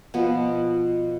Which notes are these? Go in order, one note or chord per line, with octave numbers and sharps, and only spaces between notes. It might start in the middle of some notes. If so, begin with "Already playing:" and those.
B2 F3 B3